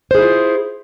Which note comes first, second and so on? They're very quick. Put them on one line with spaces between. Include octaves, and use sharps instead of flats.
C5 G#4 E4 F4